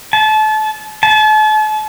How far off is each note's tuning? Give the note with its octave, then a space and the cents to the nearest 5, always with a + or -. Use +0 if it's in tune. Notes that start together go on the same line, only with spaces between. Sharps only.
A5 -30
A5 -40